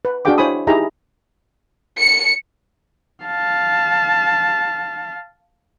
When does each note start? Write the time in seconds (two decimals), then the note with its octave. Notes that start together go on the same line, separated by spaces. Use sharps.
0.05 B4
0.25 D4 F#4 G#4 F5 G5 D6
0.38 E4 C5 C#5 G#5 B5 D#6
0.67 D#4 E4 G4 G#4 A#5
1.99 C#7
3.24 F5 A5